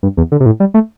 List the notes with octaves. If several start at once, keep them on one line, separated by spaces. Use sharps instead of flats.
G2
E2
D3
C3
A2
G3
A3